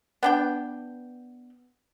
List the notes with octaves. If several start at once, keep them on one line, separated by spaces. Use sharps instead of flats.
B3 D4 G5